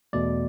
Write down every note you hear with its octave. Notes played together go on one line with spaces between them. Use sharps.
E2 B2 A3 D5